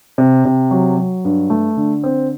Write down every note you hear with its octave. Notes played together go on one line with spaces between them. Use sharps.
C3
C3
F#3
F#3
G2
A3
D3
C4